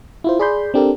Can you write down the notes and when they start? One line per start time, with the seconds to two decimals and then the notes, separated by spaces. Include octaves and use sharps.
0.24 E4 F4 C5
0.39 G#4 D5 B5 C6 G6
0.74 C4 D4 G4 A4 A#4